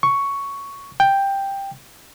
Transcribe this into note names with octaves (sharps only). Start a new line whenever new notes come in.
C#6
G5